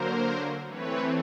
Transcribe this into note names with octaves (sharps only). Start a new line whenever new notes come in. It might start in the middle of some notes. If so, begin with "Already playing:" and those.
Already playing: D3 F#3 A#3 A#4 C5
E3 A3 C4 B4 C#5